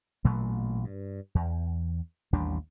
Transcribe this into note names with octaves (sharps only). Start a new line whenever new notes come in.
A1 A#2 F#3 A3
G2
E2
A1 D#2 G3 D4